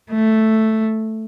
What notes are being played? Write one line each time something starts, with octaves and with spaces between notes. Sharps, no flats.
A3